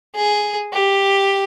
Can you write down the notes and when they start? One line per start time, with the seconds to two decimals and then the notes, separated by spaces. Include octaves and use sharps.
0.15 G#4
0.73 G4